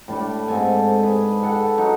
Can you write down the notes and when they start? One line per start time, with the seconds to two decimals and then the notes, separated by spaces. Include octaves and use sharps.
0.08 A2 G3 D4
0.48 G#2 C4 A4 G#5
1.03 G#4 B4
1.42 A4 F#5 G5
1.78 F#3 D#4 F#5